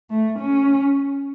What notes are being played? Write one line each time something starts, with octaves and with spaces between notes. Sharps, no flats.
A3
C#4